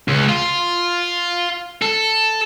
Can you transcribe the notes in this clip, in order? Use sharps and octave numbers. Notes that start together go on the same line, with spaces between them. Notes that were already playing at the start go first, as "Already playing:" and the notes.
C#2
F4
A4